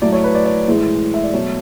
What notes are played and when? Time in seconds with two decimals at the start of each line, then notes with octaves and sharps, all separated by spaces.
0.02 A2 F#3 A3 D5
0.13 C#5
0.24 B4
0.35 D5
0.45 D5
0.68 A2 E3 G#3
1.14 E5
1.24 D5
1.33 B2 F#3 A3 C#5